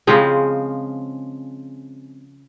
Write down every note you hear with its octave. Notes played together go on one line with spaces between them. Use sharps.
C#3 F3 G#3 C4